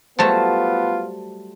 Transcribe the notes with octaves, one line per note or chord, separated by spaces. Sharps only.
F#3 G3 A3 B3 F4 C5 A5